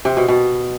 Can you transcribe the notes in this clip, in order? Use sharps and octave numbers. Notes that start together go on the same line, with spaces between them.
C3
B2
B2